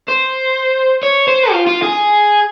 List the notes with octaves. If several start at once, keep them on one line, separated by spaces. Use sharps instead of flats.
C5
C#5
C5
F4
F4
G#4